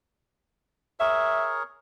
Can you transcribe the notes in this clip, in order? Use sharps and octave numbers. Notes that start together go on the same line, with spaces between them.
G#4 A#4 C#5 E5